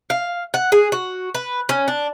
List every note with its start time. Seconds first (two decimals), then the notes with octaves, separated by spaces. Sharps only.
0.10 F5
0.54 F#5
0.72 G#4
0.92 F#4
1.34 B4
1.69 C#4
1.88 D4